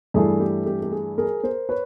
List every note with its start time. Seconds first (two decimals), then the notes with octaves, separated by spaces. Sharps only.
0.14 G2 E3 A3 G#4
0.40 G4
0.66 G4
0.82 G4
0.92 G#4
1.18 G#4 A#4
1.43 A#4 C5
1.69 B4 C#5